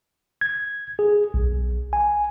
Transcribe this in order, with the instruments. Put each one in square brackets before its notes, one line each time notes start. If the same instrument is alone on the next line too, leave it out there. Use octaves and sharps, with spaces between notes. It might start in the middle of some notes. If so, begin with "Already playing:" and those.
[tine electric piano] G#6
G#4
B1
G#5